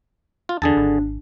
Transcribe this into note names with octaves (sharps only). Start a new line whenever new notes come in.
F4
E2 D3 D4 G#4 A5
G#1